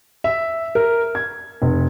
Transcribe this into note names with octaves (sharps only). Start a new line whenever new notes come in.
E5
A#4
G#6
F1